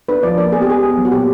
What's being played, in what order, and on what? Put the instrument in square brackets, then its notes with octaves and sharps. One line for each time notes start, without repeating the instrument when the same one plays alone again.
[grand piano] D4 [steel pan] B4
[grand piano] F3 [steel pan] D5
[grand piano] A#3 [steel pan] D5
[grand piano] B3 [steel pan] G#4
[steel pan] G4
[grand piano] B3 [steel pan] G#4
[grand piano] B3
F#3
[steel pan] F#4
[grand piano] A#2 [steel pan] G4